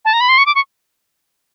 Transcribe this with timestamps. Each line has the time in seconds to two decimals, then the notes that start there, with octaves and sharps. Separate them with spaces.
0.05 A5
0.13 A#5
0.21 B5
0.29 C6
0.38 C#6
0.46 D6
0.55 C#6